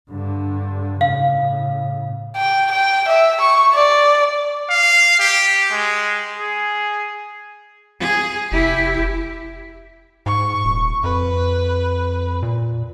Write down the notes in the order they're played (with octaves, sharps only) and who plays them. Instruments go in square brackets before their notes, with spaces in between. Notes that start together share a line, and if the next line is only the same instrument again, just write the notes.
[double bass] G2 D3
[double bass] A2 C#3 [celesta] F5
[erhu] G5
G5
E5
C#6
D5
[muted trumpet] F5
G4
G#3
G#4
[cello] G#4
[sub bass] F1 [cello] E4 G4
[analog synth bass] G#2 [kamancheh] C#6
[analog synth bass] D#1
[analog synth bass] F2 [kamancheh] B4
[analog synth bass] A#2